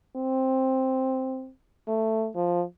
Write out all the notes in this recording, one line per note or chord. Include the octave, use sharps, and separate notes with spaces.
C4
A3
F3